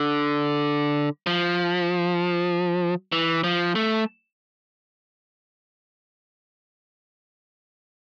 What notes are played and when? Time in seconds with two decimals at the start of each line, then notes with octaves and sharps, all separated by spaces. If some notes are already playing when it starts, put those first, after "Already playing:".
Already playing: D3
1.27 F3
3.12 E3
3.44 F3
3.75 A3